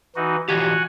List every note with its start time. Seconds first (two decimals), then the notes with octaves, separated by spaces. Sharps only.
0.16 E3 D#4 F#4
0.48 E3 F3 F#4 G4 F#5 G#5